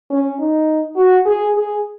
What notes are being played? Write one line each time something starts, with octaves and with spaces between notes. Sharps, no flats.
C#4
D#4
F#4
G#4
G#4